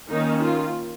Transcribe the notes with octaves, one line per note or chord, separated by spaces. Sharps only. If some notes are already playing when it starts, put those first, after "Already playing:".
D#3 A#3 C#4 D#4
F4